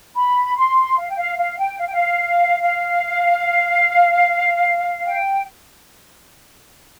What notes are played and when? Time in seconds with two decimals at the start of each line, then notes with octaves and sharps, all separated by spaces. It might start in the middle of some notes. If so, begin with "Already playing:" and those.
0.15 B5
0.56 C6
0.97 F5
1.09 G5
1.18 F5
1.38 F5
1.58 G5
1.79 F5
1.86 G5
1.93 F5
2.61 F5
5.05 G5